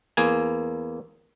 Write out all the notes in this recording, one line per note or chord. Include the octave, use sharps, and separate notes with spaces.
E2 A#3 G#5